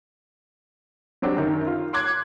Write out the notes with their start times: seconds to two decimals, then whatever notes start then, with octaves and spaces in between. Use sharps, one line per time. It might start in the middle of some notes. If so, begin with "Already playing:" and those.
1.22 F#3 C4 D4 F#4 G4
1.36 F#2 D#3
1.67 F4
1.93 C6 D6 F#6 G#6